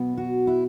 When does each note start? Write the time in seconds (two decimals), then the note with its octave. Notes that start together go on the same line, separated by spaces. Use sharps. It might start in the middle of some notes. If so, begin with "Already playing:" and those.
Already playing: B2 F#3 B3
0.17 F#4
0.47 E4